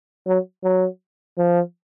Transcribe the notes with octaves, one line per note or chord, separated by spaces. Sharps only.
F#3
F#3
F3